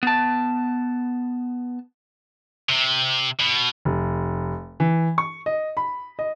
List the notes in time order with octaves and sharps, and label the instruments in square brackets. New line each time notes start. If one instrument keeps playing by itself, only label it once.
[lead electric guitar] B3 A5
[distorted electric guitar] C3
B2
[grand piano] F1
E3
C#6
D#5
B5
D#5